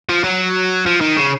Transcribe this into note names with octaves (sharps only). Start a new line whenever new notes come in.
F3
F#3
F3
D#3
C#3